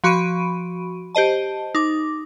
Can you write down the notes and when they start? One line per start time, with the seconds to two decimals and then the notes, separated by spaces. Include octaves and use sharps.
0.04 F3 F#4 B5 C#6 D7 D#7
1.15 G4 C5 D#5 A5
1.75 D#4 D6